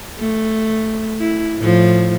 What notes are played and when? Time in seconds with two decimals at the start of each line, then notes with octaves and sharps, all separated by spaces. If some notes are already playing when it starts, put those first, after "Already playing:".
0.19 A3
1.20 E4
1.59 A2 F3